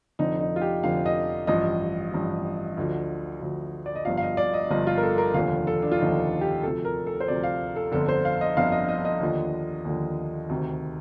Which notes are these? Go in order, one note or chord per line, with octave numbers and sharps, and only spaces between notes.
F1 F2 D3 F3 D#4
D#4
F4
G4
F1 F2 D3 F3 F5
D#5
A1 G2 F3 D#5
A1 G2 F3
D2 D3 F3
D2 D3 F3
D5
D#5
G1 G2 F3 F5
F5
D#5
D5
D#5
G1 G2 F3 D#5
F4
A#4
A4
A#4
F1 D#2 D3 F3 F5
A4
D4
F4
F1 D#2 D3 F3 D#4
G4
D2 C3 F3 A4
A#4
A4
C5
D2 C3 F3 D5
F5
A4
G1 F2 D3 A4
C5
F5
D#5
G1 F2 D3 F5
D#5
D#5
D#5
D#2 D3 F3
D#2 D3 F3
D2 C3 D#3